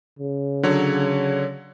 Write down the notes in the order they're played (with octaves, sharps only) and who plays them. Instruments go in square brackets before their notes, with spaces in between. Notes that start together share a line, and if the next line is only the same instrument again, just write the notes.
[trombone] C#3
[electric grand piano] D3 F#3 C#5